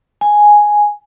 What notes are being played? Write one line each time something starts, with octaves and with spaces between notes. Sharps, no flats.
G#5